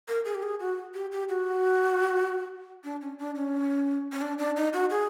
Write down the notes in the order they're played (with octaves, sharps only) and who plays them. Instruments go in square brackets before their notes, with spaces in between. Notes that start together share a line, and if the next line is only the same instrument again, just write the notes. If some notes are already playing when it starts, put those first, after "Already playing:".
[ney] A#4
G#4
G4
G#4
F#4
G4
G4
F#4
D4
C#4
D4
C#4
C#4
D4
D4
D#4
F#4
G#4